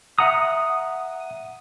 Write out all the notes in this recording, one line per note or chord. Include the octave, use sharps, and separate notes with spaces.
E5 F#5 A#5 D#6